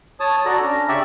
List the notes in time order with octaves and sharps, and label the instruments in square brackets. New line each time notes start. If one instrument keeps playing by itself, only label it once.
[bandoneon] C#5 A5 D#6
[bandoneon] F#4 A4 D5 [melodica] A#5
[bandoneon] C#4 D4
[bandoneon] C#3 C#6 [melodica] G4 D5 E5